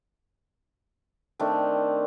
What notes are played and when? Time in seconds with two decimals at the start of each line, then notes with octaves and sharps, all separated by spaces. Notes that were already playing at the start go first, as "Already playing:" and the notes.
1.39 D#3 A3 C4 D4